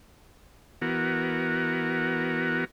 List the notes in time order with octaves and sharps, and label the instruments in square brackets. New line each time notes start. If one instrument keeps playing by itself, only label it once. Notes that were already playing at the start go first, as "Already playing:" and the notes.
[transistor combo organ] E3 B3 F#4 A#4